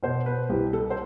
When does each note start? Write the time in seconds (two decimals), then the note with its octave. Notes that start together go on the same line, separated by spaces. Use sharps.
0.03 B2 C5
0.26 B4
0.49 C2 G4
0.73 A4
0.90 C5